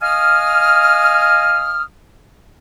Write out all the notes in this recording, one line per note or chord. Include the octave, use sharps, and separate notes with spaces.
D#5 F5 G#5 D#6 F6